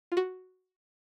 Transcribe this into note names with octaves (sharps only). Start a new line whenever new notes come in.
F4
F#4